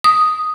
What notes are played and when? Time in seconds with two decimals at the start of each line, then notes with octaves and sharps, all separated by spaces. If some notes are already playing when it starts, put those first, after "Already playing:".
0.04 D#6